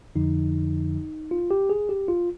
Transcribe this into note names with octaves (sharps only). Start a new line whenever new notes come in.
F2 D3 F3 D#4
F4
G4
G#4
G4
F4